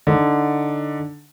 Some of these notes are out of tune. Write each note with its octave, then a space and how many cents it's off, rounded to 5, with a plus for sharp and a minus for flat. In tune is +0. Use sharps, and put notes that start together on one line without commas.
D3 +0 D#4 +0